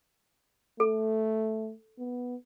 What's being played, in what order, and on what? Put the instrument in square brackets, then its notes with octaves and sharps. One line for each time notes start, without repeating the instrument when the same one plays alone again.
[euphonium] A3 [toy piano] A4
[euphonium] B3